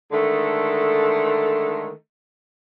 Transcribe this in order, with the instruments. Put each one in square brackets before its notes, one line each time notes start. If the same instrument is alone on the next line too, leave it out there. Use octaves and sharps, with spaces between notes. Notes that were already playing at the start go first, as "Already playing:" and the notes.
[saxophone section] D3 D#3 G#3 A3 A4